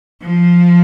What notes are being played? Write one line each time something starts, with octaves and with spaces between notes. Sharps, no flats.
F3